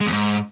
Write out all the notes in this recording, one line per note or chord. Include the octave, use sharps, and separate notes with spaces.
G#3
E2
G#2